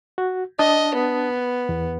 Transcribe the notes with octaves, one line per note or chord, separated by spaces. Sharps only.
F#4
D4 D#5 A5 D#6
B3
E2